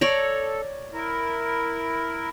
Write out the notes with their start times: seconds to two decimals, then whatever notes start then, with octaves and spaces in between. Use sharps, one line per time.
0.01 A4 C#5 D5 A#5
0.93 E4 A#4